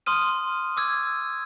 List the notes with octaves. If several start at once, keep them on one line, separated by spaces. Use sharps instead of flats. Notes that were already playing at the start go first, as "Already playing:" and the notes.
C6 D#6 F6 D#7
D6 E6 G#6